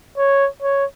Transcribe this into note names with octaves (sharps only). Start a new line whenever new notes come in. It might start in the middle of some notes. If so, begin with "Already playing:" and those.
C#5
C#5